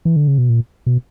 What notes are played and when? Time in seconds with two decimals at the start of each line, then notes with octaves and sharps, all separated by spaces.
0.05 E3
0.16 D3
0.28 C#3
0.38 B2
0.49 A#2
0.86 B2